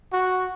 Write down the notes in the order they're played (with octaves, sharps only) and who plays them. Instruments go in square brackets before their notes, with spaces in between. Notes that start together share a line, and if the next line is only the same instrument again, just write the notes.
[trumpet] F#4